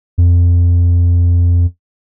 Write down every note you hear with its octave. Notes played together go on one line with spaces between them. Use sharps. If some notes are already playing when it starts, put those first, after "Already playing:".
F2